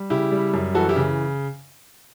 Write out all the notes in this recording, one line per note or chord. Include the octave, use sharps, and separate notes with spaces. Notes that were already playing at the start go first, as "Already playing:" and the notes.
Already playing: G3
C#3 E4 G4
G3
F#2
E3 F#4 A4
E4 G4
C#3